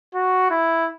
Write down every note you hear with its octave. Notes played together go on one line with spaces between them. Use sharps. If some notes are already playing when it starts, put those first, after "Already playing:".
F#4
E4